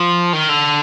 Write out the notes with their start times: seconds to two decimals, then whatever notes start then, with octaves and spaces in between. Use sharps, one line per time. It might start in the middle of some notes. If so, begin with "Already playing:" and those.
Already playing: F3
0.33 D#3
0.49 D3